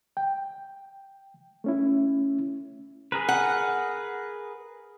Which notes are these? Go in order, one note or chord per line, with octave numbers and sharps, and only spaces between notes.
G5
A3 C#4 E4
G#4 A#4 B4
F#5